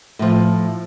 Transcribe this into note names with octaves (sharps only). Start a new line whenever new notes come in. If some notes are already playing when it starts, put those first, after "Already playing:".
A2 F3